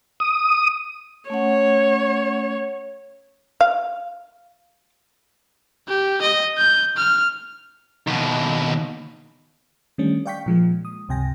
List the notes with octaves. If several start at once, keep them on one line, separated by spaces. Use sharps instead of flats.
D#6
A3 C#4 C#5 F#5
F5
G4
D#5
G6
F6
D#2 B2
D#3 G3 A3 C#4 D4
D5 F5 G5 C#6 G6 B6
A#2 F3 G#3 A#3
D#6
C#2 G2 C3 G5 G#5 A#6